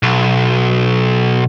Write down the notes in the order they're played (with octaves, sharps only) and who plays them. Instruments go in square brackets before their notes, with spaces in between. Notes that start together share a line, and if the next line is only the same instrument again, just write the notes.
[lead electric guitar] B1